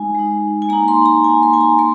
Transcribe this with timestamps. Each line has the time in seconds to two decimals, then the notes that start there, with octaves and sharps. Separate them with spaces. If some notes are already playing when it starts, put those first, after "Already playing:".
Already playing: G#3 D#4 G#5
0.15 G#3 D#4
0.62 G#5
0.69 A#3 D#4 A#5
0.88 C6
1.06 A#5
1.24 A#3 D#4 G#5
1.43 C6
1.53 G#5
1.61 A#5
1.79 A#3 C6